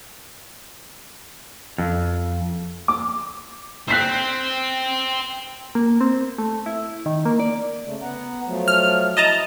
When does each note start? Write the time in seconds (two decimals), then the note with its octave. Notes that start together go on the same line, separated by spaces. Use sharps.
1.78 F2
2.88 D6
3.88 C5 G5 F#6 B6 C7
5.75 A#3
6.01 C4
6.38 A3
6.66 E4
7.06 D#3
7.25 A#3
7.40 D5
7.85 C#3 A3
8.02 B3 F#5 A#5
8.46 F3 F#3 A3
8.68 F6
9.17 E4 D#5 A5 A#5